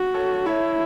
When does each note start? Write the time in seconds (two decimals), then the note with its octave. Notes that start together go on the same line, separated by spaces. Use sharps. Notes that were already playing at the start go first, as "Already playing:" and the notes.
Already playing: F#4
0.14 A4 C#5
0.46 E4 C#5 E5